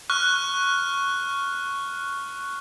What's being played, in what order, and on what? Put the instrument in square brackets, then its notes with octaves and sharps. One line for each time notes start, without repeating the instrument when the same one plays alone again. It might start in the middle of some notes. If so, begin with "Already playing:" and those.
[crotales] C#6 F6 F#6